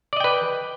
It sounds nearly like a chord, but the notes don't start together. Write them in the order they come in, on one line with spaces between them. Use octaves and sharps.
D5 D#5 G5 B4